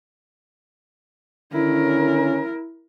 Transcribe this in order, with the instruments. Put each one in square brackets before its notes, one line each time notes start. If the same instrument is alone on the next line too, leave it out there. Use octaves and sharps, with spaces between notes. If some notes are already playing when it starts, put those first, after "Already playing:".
[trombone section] D3 D#3 C#4 [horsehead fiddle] E4 A#4